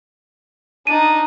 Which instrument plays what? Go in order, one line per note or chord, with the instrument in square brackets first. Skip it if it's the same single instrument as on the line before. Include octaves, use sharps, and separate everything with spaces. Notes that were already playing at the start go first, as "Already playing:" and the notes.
[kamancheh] D4 D#4 [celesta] D#7